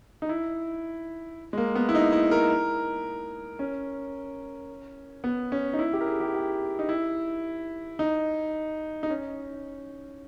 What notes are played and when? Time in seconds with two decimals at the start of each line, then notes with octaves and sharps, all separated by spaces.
0.22 D#4
0.29 E4
1.53 G#3
1.58 A#3
1.75 B3
1.89 E4
1.95 D#4
2.12 E4
2.31 A#4
3.59 C#4
5.24 B3
5.52 C#4
5.73 D#4
5.79 E4
5.93 G4
6.01 A#4
6.07 G#4
6.20 G4
6.34 G4
6.79 D#4
6.89 E4
7.99 D#4
9.03 D#4
9.10 C#4